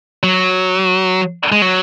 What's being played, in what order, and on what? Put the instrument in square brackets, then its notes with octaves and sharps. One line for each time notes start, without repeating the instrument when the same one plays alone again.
[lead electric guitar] F#3
G#3
F#3